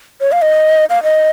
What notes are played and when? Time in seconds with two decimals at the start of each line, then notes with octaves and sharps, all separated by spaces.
0.21 C#5
0.32 F5
0.42 D#5
0.90 F5
1.03 D#5